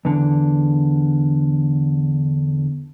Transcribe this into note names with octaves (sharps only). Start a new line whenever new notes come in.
E2 D3